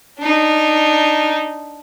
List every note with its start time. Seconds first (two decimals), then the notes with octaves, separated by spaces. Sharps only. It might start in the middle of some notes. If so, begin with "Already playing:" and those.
0.19 D4 D#4